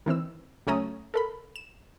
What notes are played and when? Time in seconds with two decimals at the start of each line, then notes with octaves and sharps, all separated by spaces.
0.06 D#3 E3 C4 E6
0.67 C#2 F#3 A3 C#4 A#5 D#6
1.14 A4 A#4 B5
1.56 E7